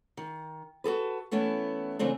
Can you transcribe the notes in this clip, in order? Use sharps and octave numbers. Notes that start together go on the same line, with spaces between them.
D#3
F#4 G#4 A4 B4
E3 A3 B3 C#4 E4
C#3 E3 A3 C4 D4